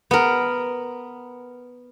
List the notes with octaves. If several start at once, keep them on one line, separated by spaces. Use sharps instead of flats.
B3 A#4